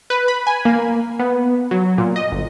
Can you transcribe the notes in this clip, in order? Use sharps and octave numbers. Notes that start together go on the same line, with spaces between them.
B4
B5
G#5
A#3
B3
F#3
A#2
D#5
G1